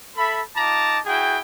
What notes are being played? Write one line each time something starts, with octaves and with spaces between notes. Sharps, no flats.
A4 E5 B5
D#4 F4 A5 A#5 D6
E4 F#4 G#4 G5